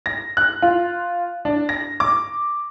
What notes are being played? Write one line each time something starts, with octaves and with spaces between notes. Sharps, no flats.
A#6
F#6
F4
D4
A#6
D6